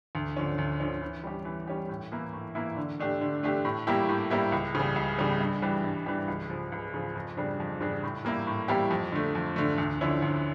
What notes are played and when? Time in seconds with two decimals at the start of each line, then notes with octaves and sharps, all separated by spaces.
0.15 D2
0.37 D3 F3 C#4
0.58 D2
0.80 D3 F3 C#4
1.01 E3
1.23 G3 C#4 G4
1.45 E3
1.67 G3 C#4 G4
1.89 A2
2.12 E3 A#3 E4
2.33 A2
2.55 E3 A#3 E4
2.77 D3
3.00 A3 D4 G4
3.21 D3
3.43 A3 D4 G4
3.65 A2
3.87 G3 A#3 E4 G4
4.09 A2
4.30 G3 A#3 E4 G4
4.52 C#2
4.75 C#3 G3
4.96 C#2
5.19 C#3 G3
5.40 G2
5.62 E3 G3 D4 G4
5.84 G2
6.06 E3 G3 D4 G4
6.28 C#2
6.50 C#3 F3
6.72 C#2
6.94 C#3 F3
7.15 F2
7.37 C#3 G3 D4
7.60 F2
7.81 C#3 G3 D4
8.03 A2
8.25 G3 A#3 E4 G4
8.47 A2
8.68 G3 A#3 E4 G4
8.91 F2
9.12 D3 A3
9.35 F2
9.56 D3 A3
9.78 D2
10.01 D3 F3 C#4 E4
10.22 D2